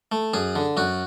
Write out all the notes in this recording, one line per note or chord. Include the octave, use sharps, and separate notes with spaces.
A3
F#2 G#4
D3
F#2 F#4